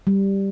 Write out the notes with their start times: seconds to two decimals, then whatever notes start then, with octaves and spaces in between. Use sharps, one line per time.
0.07 G3